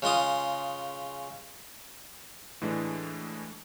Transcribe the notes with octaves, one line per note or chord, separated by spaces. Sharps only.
C#3 G#3 F4 D#6
A2 E3 G#3 D4